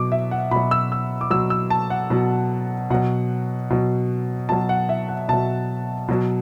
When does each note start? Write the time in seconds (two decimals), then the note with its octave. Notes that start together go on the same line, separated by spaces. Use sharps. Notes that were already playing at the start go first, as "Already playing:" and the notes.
Already playing: B2 F#3 D6
0.12 E5
0.31 F#5
0.51 B2 F#3 B5
0.71 E6
0.92 E6
1.21 D6
1.30 B2 F#3 E6
1.50 E6
1.70 A5
1.90 F#5
2.10 B2 F#3
2.90 B2 F#3 F#5
3.70 B2 F#3
4.49 B2 F#3 A5
4.69 F#5
4.89 E5
5.09 F#5
5.28 B2 F#3 A5
6.08 B2 F#3